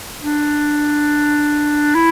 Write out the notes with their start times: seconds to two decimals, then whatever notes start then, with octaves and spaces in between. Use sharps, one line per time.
0.21 D4
1.95 E4